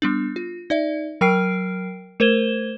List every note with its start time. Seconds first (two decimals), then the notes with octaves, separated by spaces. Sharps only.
0.02 G3 B3 D4
0.36 F4
0.70 D#4 D5 E5
1.21 F#3 A#4 G5 F6 C7 D7
2.20 A3 A#4 C5 G#6 E7 G7